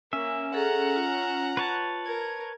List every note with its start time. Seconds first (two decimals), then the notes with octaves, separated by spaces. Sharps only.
0.13 A#3 C#4 E5
0.54 G#4 A4 F#5 A#5
0.96 F4
1.57 B4 C#5 A5
2.05 A#4 G#6